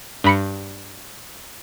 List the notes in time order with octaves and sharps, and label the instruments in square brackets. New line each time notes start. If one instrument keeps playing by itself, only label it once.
[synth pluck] G2 B5 C#7